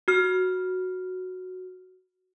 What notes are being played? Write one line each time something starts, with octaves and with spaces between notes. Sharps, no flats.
F#4 F6